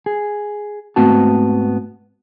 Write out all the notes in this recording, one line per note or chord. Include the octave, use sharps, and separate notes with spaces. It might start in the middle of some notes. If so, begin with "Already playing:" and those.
G#4
G#2 A3 B3 C4 F#4 A5